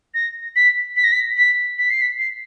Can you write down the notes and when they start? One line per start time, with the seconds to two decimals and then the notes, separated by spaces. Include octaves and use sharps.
0.14 A#6
0.56 B6
0.96 B6
1.04 A#6
1.12 B6
1.37 B6
1.78 B6
1.90 C7
2.02 B6
2.19 C7